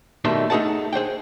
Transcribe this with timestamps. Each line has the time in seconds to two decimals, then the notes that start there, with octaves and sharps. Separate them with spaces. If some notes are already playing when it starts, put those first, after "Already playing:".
0.25 B2 D#3 G3 A3 E5 C6
0.50 A3 D#4 G#4 F#5 A5
0.93 G#4 C5 F#5 G5